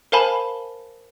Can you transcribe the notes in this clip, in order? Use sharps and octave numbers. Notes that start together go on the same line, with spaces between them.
A#4 C5 F5 G#5 A5 B5